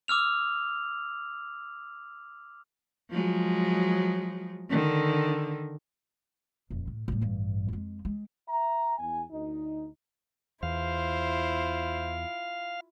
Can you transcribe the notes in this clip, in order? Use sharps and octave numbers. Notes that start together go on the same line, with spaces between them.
D6 E6 F6 F7
F3 F#3 G#3
D3 D#3
D#1 F2
A2
A2 G3
A1 G2
F2 G#3
G#3
E5 A#5
E2 G#5
D2 D#4
E2 E4 F4 C5 F5